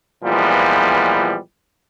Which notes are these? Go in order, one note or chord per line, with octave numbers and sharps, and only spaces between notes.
A#2 E3 F3 G3 G#3 B3